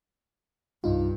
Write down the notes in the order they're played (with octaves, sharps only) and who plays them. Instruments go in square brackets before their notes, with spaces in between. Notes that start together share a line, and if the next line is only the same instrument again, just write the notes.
[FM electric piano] C2 D#4 F4 [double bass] G2